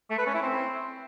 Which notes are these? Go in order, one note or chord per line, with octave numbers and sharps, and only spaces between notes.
A3
B4
C#4
E4
C4